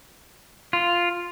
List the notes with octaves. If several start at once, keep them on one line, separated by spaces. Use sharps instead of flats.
F4